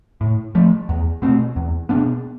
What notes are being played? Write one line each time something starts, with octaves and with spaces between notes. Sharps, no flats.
A2
F3 A3
E2
B2 A3 C4
E2
B2 B3 D4